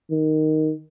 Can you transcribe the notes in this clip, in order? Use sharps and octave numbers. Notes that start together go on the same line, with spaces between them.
D#3